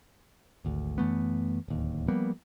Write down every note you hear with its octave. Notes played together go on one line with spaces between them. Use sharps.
G#1 D2
F#2 E3 A3 B3
D1 D#2
F3 G3 A#3 B3